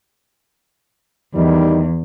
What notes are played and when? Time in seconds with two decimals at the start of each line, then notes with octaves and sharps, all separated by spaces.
1.35 E2 D#3 G3 D#4